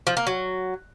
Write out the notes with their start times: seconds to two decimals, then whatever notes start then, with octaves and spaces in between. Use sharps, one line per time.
0.07 F3
0.17 A#3
0.27 F#3